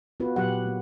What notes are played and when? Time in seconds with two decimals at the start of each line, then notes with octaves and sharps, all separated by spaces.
0.20 B3 F4 F#4 B4
0.36 A#2 F#3 G4 B4 F#5
0.66 A#3